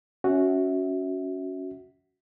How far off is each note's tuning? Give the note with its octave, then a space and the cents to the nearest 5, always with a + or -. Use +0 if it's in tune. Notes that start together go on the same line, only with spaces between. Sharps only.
C#4 +10 F#4 +0 E5 -20